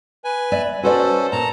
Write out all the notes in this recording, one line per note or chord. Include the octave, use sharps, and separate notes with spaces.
B4 G#5
D5 E5
C#4 F#4 A4 B4 C5 D5
A#2 A5 A#5